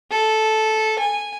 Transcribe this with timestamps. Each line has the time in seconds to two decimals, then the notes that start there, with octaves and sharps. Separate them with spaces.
0.11 A4
0.99 G#5